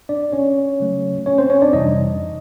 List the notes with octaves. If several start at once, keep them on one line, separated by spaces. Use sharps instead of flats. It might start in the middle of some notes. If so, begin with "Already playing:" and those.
D4 D5
C#4 C#5
C#3 F#3 A3
C#4 C#5
C4 C5
C#4 C#5
D4 D5
F2 C3 E3 G3 D#4 D#5